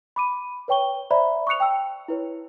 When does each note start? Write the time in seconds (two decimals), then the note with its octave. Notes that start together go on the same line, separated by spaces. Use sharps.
0.16 B5 D6 D#7
0.68 B4 C#5 G5 C#6 G7
1.11 C5 D5 E5 A#5 B5
1.47 C#6 D#6 F#6 C#7 F7
1.60 G5 A5 E6
2.08 E4 B4 C#5